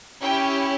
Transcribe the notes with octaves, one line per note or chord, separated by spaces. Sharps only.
C#4 E4 G4 G5